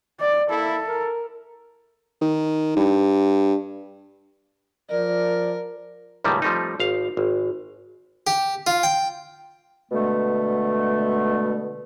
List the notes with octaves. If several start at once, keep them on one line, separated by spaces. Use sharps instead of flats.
D5
A#3 E4 A4
A#4
D#3
G2
F3 A#4 D5
C#2 A2 D#3 E3 G3 A#3
F3 G3 A3 C4 D#4
G#1 F5
G#1
G4
F4
G5
B2 D3 G#3 A3